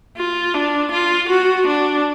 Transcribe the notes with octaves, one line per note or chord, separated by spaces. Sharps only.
F4
D4
F4
F#4
D4